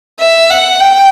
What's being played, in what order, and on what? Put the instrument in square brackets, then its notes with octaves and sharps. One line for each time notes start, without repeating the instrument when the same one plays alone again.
[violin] E5
F#5
G5